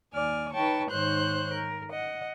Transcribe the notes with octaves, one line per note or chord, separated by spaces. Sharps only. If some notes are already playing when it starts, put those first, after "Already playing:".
D#2 D5 G#5 F6
D#4 B4 C#5 G5 A5 C#6
G#2 D#3 C5 C#5 F#6 G6
A#4
D#5 F#5